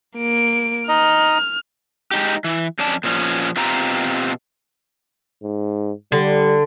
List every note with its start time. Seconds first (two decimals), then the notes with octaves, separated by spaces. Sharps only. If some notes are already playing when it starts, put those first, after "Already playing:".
0.18 A#3 D7
0.88 D#4 D#5 F6
2.11 G#3 D#4 G4
2.44 E3
2.79 F2 C#4 D5 A5
3.04 A#2 F3 C#4
3.57 B2 C4 F4 G4 A#5
5.43 G#2
6.12 D3 G3